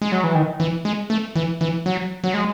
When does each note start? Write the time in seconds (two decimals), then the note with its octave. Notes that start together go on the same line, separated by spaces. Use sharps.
0.02 G#3
0.12 F#3
0.24 E3
0.35 D#3
0.60 E3
0.85 G#3
1.10 A3
1.36 E3
1.61 E3
1.86 F#3
2.24 F#3
2.34 G#3